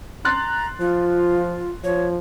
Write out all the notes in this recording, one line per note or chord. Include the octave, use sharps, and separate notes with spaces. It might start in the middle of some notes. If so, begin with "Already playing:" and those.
A#5 C6 F#6 A6
F3 F4
F3 C#5